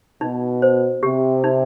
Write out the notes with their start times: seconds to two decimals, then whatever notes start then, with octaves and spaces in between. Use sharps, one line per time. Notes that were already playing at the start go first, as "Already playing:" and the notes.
0.21 B2 D#4
0.62 C5
1.03 C3 G4
1.44 D#4